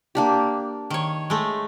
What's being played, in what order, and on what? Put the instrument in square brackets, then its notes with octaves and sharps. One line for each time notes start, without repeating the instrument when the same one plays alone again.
[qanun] A#3 D4 G4
[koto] D#3 C#5
G#3 A3